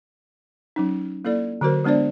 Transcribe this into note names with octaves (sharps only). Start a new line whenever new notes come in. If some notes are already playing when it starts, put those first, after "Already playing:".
F#3 C#4 D#4
A#3 E4 A4 D5
D3 F#3 F#4 A#4 C5
G#3 B3 D4 C5 D5